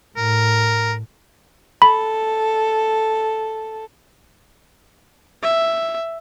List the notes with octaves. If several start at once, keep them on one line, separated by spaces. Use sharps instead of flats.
A2 A#4
A4 B5
E5